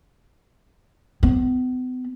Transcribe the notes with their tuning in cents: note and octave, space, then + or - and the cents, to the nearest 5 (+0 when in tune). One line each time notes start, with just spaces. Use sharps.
B3 +40